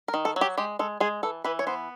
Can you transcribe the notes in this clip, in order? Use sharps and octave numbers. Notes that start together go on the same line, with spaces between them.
A#4
D#3
A4
F#3
G4
G#3 G4
G#3 A4
G#3 G#4
E3 A4
E3 B4
C#5
B3 C5